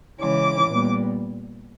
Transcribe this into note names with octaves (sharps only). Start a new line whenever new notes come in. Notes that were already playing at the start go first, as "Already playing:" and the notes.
C#3 E3 G#3 C#4 D6
A#2 G3 B3